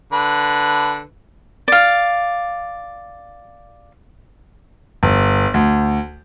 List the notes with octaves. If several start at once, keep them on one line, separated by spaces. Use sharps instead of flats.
D3 B4
D5 F5
G1
D2